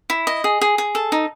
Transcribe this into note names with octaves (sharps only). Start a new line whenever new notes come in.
E4
D#5
G#4
G#4
G#4
A4
D#4